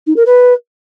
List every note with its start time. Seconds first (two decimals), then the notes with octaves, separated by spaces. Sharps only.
0.07 D#4
0.16 A#4
0.26 B4